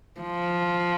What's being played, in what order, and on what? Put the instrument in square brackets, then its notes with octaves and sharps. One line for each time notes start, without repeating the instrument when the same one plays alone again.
[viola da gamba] F3